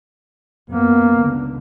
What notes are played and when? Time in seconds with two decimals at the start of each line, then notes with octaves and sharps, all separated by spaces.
0.70 F#2 A#3 B3
1.15 C#2 D3